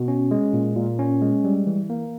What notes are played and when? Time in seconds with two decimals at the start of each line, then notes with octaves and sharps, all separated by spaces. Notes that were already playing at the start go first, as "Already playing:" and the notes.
Already playing: B2
0.08 C#4
0.31 G#3
0.53 A#2
0.76 A#2
0.99 C#4
1.22 G#3
1.44 G3
1.67 E3
1.90 A#3